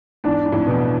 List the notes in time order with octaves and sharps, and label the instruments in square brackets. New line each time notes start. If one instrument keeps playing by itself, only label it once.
[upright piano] E2 G#2 [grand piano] D4
[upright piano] G#2
F2 A2
[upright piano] E2 [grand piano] B2